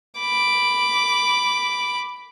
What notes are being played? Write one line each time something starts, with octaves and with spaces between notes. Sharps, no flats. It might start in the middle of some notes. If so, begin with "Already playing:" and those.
B5 D6